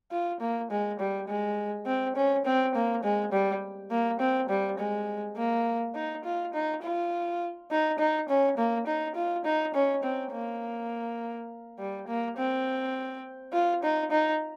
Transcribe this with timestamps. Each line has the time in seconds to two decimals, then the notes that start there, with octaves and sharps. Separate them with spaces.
0.11 F4
0.41 A#3
0.71 G#3
1.00 G3
1.28 G#3
1.86 C4
2.16 C#4
2.45 C4
2.75 A#3
3.04 G#3
3.32 G3
3.91 A#3
4.20 C4
4.49 G3
4.79 G#3
5.37 A#3
5.95 D#4
6.24 F4
6.54 D#4
6.82 F4
7.71 D#4
7.99 D#4
8.29 C#4
8.57 A#3
8.87 D#4
9.16 F4
9.45 D#4
9.74 C#4
10.03 C4
10.32 A#3
11.79 G3
12.08 A#3
12.37 C4
13.53 F4
13.83 D#4
14.11 D#4